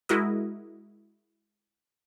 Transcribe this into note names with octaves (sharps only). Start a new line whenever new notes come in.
G#3 E4 F#4 A#4 D#5